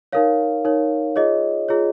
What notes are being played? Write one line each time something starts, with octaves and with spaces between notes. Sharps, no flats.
D#4 A#4 C#5 F5
D#4 A#4 C#5
F4 G#4 C#5 D#5
F4 G#4 C#5